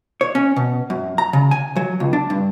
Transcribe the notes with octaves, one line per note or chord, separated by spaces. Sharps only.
C#5
C#4
B2
F#2
A#5
C#3
G#5
F#3
C#2
D4
G2